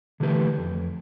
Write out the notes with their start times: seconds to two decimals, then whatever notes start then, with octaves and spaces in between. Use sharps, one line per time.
0.20 D3 E3 A3 G4 B4
0.58 F2